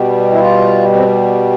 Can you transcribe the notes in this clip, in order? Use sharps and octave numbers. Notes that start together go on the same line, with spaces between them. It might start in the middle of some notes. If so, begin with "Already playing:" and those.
Already playing: B2 G3
E4
F4
C4